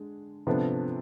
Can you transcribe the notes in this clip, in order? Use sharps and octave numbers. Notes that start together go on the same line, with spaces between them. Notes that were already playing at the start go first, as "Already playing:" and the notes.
Already playing: D3 G#3 D4 G#4
C3 F3 B3 D4 A4